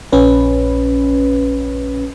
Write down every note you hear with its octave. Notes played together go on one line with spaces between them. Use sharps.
A#1 C#4 B4